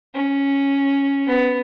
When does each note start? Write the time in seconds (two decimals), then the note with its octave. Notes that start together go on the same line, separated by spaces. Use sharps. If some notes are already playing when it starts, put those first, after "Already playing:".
0.14 C#4
1.27 B3